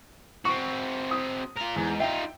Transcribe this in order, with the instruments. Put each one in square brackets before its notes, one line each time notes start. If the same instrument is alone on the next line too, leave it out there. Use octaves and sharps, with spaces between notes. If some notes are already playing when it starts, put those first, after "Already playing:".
[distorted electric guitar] C4 F#4 [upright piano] C#6
[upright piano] D#6
[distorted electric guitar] F4 A#4
[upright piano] E2 [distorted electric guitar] G#2
[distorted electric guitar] D#4 F4 [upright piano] E5 G5